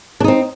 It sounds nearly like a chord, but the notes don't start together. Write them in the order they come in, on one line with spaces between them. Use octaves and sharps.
D4 D#4 C4